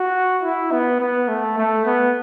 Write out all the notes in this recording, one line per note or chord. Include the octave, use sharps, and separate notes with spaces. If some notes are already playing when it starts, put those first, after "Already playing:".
Already playing: F#4
E4
B3
B3
A3
A3
B3